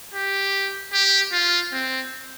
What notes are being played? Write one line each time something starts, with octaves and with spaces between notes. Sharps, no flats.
G4
G4
F4
C4